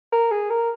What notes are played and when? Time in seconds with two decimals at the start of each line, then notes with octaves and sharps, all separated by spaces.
0.12 A#4
0.31 G#4
0.50 A#4